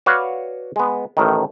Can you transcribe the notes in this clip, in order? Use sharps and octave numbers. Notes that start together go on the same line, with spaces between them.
F#4 B4 C#5 D5 F5 F#5
G#3 B3
A1 A2 D#3